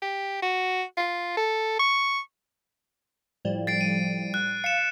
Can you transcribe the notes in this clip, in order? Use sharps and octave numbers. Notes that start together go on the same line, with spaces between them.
G4
F#4
F4
A4
C#6
A2 F3 G3
A6 C7 D7
D#7
F#6
F5 C#7 E7